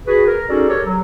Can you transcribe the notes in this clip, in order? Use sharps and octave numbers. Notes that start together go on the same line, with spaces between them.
F#4 G#4 B4
A#4
C#4 D#4 F#4 G#4 A4 D5
G4 A4 A#4 C#5
F#3